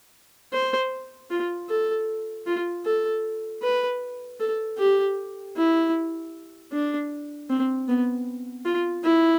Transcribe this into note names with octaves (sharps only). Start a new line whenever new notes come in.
C5
F4
A4
F4
A4
B4
A4
G4
E4
D4
C4
B3
F4
E4